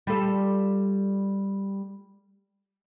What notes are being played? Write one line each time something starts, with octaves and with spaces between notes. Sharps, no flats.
G3 F4 A4